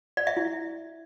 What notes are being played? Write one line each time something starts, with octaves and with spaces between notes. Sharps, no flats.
D5
E5
E4